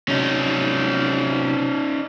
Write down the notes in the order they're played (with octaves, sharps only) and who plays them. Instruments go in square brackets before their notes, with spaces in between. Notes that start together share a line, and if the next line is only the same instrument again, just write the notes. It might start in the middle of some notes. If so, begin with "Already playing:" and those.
[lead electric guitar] C3 F#3 [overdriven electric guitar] C#4 D#4